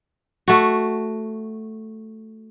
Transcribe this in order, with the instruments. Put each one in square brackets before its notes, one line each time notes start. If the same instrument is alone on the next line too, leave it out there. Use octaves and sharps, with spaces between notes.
[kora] A3 F#4